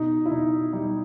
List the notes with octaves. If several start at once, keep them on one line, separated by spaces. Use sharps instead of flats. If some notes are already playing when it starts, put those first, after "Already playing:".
Already playing: B2 D#4
E4
B2 D#4
G3 D#4